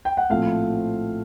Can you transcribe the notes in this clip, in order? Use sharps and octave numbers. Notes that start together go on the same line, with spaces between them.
G5
F#5
A#1 A2 F3 A3 C4 F5